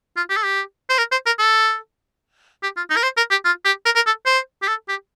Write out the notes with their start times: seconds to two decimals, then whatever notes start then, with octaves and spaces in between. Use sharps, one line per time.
0.17 F4
0.30 G4
0.37 A4
0.44 G4
0.89 C5
0.98 A#4
1.12 C5
1.26 A#4
1.39 A4
2.63 G4
2.77 F4
2.90 D#4
2.96 A#4
3.03 C5
3.17 A#4
3.31 G4
3.45 F4
3.65 G4
3.85 A#4
3.95 A#4
4.06 A4
4.26 C5
4.62 G4
4.68 A4
4.89 G4